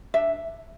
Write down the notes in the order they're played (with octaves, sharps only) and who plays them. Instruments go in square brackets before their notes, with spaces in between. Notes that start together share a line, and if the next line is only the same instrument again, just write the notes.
[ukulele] D4 E5